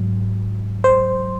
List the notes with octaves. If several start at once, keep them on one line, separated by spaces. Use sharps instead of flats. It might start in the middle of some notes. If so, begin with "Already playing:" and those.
Already playing: G#2 F#3
C5